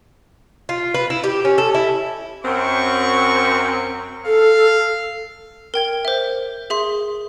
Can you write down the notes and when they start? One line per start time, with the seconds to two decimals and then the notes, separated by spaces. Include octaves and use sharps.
0.69 F4
0.94 B4
1.10 E4
1.24 G4
1.45 C#4
1.58 A4
1.74 E4
2.43 F#2 C4 C#6
4.26 A4 F5
5.74 A#4 G5 G#6
6.05 C5 E5
6.70 G#4 E5 C6 G7